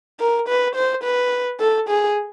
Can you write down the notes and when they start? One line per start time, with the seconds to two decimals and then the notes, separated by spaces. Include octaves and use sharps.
0.20 A#4
0.48 B4
0.75 C5
1.03 B4
1.60 A4
1.89 G#4